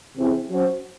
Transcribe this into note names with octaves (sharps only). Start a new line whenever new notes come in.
C3 E3 C4 E4 G#4
F#3 C#4 F#4 C5